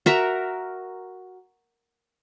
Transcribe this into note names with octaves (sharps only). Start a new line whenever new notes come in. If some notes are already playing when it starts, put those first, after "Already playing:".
F#4 A#4 E5